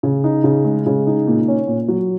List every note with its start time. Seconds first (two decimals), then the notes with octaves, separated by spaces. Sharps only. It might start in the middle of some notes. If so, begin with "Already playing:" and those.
0.03 C#3
0.24 D#4
0.44 C#3
0.65 G#3
0.86 C#3
1.07 D#4
1.27 A#2
1.48 C#4
1.68 A#2
1.88 F#3